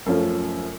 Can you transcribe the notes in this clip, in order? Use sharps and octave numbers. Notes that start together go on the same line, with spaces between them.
F#2 F3 A3 C#4